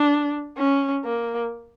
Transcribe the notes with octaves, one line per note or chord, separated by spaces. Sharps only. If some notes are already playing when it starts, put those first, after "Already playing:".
Already playing: D4
C#4
A#3